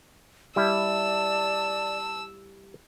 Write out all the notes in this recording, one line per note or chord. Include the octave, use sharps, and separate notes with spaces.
G3 E4 D5 A5 E6